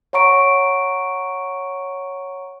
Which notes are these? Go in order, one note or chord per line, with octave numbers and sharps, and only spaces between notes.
C#5 F#5 A#5 C#6 D7